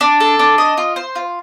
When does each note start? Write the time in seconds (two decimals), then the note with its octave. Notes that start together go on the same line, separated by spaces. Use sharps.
0.01 D4
0.20 A4
0.39 D4
0.58 D#5
0.78 F4
0.96 C5
1.16 F4